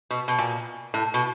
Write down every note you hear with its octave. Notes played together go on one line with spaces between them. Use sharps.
B2
B2
A#2
A2
B2